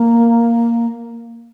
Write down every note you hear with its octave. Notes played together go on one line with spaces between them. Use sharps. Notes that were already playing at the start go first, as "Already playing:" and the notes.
Already playing: A#3